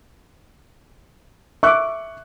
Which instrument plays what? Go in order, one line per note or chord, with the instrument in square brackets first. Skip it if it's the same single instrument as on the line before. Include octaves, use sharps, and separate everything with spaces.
[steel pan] E5 D6 [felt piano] C#6 F#6